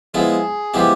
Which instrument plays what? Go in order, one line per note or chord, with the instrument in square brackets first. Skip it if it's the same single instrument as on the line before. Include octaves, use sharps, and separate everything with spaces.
[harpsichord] F3 G#3 B3 E4 [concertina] G#4
[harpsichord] F3 G#3 B3 E4 [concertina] G4